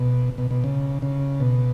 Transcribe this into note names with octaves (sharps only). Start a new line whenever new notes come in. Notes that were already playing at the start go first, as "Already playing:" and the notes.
Already playing: B2
B2
B2
C#3
C#3
B2